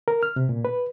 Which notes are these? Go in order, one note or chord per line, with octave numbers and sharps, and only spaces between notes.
A#4
F6
C3
A#2
B4